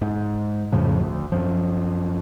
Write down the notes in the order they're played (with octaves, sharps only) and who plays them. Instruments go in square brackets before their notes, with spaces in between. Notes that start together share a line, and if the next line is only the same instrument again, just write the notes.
[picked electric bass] G#2
F2 A2 C#3 F3
D2
F#2 F3